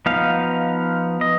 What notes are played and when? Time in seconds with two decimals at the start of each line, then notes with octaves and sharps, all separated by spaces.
0.06 F3 B3 D#4 F5
1.21 D#5